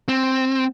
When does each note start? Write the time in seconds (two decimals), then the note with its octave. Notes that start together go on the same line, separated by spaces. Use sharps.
0.08 C4